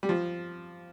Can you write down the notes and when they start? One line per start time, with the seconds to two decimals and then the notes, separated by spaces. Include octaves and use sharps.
0.03 G3
0.09 F3